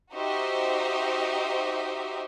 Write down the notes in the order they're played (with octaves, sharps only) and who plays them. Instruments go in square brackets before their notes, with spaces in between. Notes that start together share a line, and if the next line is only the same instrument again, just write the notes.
[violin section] D#4 F#4 G4 C5 D#5 E5